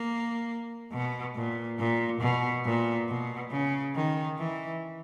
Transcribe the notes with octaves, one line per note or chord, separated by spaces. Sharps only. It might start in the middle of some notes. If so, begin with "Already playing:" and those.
Already playing: A#3
B2
A#2
A#2
B2
A#2
B2
C#3
D#3
E3